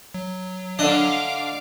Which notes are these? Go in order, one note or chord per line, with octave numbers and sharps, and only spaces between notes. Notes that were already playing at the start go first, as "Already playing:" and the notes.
F#3
D3 D4 D#5 F5 D6